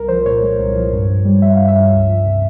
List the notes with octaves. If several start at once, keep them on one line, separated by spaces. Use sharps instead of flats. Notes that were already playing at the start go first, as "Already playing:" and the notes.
Already playing: C2 A#4
F3 C5
A#2 C#5
G#3
C2
F3
G2
G2
G3
G3 E5
G2 F5
E5
G2
C#2
F3
C3